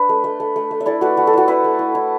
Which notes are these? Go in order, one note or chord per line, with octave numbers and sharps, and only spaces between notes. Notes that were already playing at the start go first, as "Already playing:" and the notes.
Already playing: D4 B4
A3
A3
A3
A3
A3
E5
E4 A4 D5
A3 F#4 B4
A3 F#4
A4
E4 F#4 B4
E4 B4 E5
A3
E4
E4